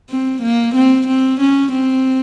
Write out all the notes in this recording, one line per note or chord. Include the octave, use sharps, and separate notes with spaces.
C4
A#3
C4
C4
C#4
C4